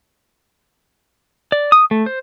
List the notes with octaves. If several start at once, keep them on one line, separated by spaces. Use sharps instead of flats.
D5
D#6
A3
C5